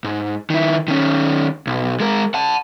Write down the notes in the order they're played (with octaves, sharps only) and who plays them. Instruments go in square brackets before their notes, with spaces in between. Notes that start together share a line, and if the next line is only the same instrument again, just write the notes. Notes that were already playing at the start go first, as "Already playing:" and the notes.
[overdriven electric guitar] G#2
D#3 E4
D#3 C#4
B1
G#3 A#4
F#5 A5